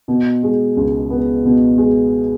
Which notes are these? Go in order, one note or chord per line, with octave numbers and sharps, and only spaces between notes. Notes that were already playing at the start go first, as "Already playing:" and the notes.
B2
G#3
C#2
B3
B2
G#3